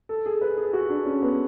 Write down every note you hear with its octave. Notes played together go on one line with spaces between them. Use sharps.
A4
G#4
B4
G#4
F#4
D4
C#4
B3